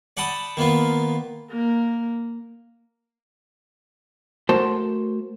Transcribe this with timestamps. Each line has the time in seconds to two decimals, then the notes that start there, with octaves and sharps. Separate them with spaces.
0.17 D5 F#5 G5 A5 B5 D#6
0.57 D#3 A#3 B3 F4
1.51 A#3
4.49 A3 F#4 A#4 C5 A5 C6